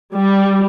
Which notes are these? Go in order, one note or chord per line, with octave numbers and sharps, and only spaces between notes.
G3